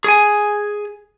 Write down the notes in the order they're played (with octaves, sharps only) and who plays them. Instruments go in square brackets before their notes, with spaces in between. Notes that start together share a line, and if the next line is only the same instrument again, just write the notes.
[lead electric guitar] G#4 G#5